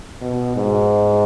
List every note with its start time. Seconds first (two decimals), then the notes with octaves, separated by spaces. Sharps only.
0.21 B2
0.56 G#2